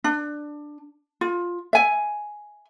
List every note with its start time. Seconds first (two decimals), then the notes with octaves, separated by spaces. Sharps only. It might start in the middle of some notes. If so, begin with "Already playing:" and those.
0.04 D4
1.21 F4
1.73 E5 G#5